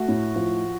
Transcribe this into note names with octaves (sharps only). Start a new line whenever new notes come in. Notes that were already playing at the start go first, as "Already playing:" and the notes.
Already playing: A3 F#4
A2
F3